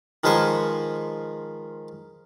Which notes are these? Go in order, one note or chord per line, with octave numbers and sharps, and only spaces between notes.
D#3 F3 G#3 B4 C5 C#6